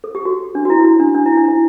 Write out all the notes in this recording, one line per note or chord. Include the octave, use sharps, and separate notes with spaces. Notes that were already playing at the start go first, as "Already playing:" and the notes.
A4
G4
F#4
D4
F#4
E4
F#4
E4
D4
D4
E4
D4
E4